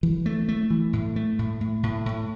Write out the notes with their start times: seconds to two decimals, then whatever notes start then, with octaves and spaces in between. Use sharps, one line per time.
0.03 E3
0.26 A3
0.48 A3
0.70 E3
0.93 A2
1.16 A3
1.39 A2
1.61 A2
1.83 A2
2.06 A2